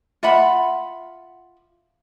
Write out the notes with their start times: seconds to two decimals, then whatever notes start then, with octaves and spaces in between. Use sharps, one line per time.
0.23 F4 E5 F#5 B5